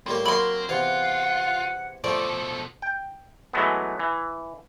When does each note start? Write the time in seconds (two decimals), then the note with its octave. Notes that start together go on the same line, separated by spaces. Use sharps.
0.06 A2 G3 A#3 C4 C5
0.25 F#3 A#3 A#4 B5 C6
0.69 E2 C3 F4 F5 F#5
2.04 B2 F3 A3 A4 D5
2.82 G5
3.53 E3 F#3 G#3 A3 B3
3.99 E3